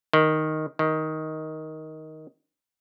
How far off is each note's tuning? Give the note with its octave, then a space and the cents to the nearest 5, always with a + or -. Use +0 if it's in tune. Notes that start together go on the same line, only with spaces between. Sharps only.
D#3 +0
D#3 +10